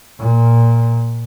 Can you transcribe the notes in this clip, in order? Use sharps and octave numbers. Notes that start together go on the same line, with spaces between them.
A#2